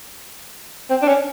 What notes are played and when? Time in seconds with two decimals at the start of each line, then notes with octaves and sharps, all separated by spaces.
0.90 C4
1.02 D4
1.08 C#4